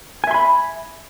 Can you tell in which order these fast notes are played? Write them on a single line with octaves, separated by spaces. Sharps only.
G#5 E5 C6 B5